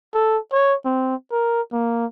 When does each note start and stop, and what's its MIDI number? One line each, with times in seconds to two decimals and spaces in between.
0.14 0.38 69
0.53 0.75 73
0.85 1.15 60
1.32 1.61 70
1.72 2.06 58